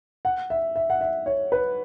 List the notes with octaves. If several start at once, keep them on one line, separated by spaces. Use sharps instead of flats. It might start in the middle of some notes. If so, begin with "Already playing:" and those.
F#5
E5
E5
F#5
E5
C#5
B4